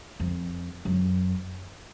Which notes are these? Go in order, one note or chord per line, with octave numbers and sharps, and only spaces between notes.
F2
F#2